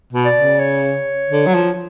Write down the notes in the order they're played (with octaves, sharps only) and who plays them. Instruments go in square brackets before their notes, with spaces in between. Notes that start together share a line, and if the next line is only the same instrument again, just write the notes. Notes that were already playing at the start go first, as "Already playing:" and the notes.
[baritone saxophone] B2
[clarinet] D5
[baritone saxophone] C#3
[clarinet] C#5
[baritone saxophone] D3
F#3
F3